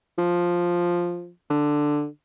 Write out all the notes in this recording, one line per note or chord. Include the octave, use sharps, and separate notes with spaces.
F3
D3